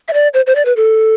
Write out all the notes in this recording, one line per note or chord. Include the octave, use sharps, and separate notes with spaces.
E5
D5
C5
C5
D5
B4
A4